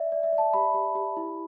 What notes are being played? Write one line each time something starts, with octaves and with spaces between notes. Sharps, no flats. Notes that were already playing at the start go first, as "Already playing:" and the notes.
Already playing: D5 E5
D5
E5
D5
A5
G4 B5
G4
G4
E4